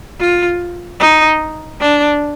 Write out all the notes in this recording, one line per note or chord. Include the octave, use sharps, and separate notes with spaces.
F4
D#4
D4